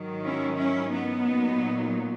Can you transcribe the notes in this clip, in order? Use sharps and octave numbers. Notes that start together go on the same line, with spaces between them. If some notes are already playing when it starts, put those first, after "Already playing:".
Already playing: G#2 D#3 F#3
C#4 E4
C#4 E4
B3 D#4
A#2 F#3